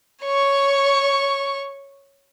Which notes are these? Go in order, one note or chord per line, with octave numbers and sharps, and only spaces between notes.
C#5 C#6